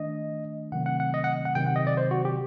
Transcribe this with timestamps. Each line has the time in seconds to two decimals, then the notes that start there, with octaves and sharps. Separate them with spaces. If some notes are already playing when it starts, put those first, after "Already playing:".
Already playing: D#3 A3 D4 D#5
0.72 C3 D#3 F#3 A3 C4 F#5
0.86 F#5
1.00 F#5
1.14 D#5
1.24 F#5
1.45 F#5
1.55 C3 D#3 F#3 C4 G5
1.66 F#5
1.76 D#5
1.87 D5
1.97 C5
2.11 F#4
2.25 G4